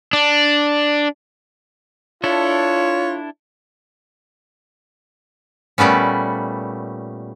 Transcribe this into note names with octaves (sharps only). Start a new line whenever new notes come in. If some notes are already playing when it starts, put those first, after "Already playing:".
D4
D4 E4 F4 A4 C#5
A#2 G3 A3 B3 C#4